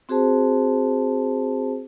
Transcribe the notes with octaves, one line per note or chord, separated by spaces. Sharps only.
C4 F#4 G#4 C5 A5